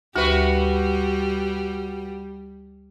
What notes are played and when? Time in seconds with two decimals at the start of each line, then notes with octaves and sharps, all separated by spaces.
0.16 D2 G3 F#4 B4 E5